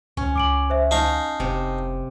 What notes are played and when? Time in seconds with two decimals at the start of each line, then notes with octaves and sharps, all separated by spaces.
0.17 C#2 C#4
0.36 C#2 D6 D7 F#7
0.70 C5 E5
0.91 D#4 F5 G#5 A5 C#6
1.40 F1 C3